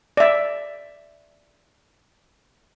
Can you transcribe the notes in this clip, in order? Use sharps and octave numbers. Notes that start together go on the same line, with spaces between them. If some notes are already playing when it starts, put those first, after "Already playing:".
D5 E5